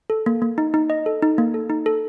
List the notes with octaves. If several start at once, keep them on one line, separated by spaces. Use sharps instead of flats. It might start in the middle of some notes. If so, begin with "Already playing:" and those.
A4
A#3
A#3
D#4
D#4
D#5
A4
D#4
A#3
A4
D#4
A4